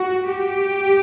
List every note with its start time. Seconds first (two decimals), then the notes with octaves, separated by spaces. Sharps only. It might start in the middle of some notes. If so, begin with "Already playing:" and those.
Already playing: F#4
0.27 G4